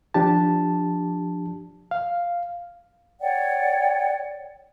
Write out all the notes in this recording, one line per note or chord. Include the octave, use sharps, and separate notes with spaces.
F3 D4 G4 A5
F5
C#5 D5 F#5 G5